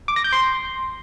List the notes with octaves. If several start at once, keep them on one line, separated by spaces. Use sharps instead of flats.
D6
A#6
G6
C6